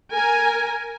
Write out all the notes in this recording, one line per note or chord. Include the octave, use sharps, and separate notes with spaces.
A#4 G#5